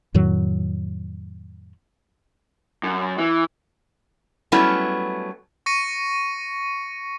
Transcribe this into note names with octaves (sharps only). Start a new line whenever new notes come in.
F2 A2 D#3 F#3
F#2
E3
F#3 G3 A3 B3 C#4 E4
C#6 A#6 C#7 D#7